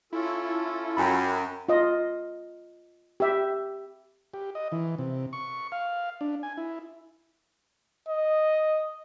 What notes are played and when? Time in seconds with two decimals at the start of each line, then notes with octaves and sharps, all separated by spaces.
0.13 C#4 E4 F4 A4
0.97 F#2 G5 G#5 B5
1.69 F4 D#5
3.20 G4 E5
4.34 G4
4.55 D#5
4.72 E3
4.99 C3
5.33 C#6
5.72 F5
6.21 D4
6.43 G#5
6.57 E4
8.08 D#5